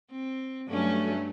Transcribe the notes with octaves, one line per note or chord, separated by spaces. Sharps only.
C4
G2 F#3 A3 C#4